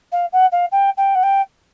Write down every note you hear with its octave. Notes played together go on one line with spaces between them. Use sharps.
F5
F#5
F5
G5
G5
F#5
G5